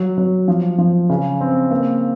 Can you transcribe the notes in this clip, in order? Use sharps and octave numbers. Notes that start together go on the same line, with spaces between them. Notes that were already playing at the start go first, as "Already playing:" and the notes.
Already playing: F#3
F#3
F3
F3
C#3
C4
A#3